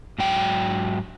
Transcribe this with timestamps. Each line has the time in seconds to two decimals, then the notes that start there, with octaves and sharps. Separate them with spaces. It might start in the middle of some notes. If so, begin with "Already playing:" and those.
0.18 G#2 F#3 G5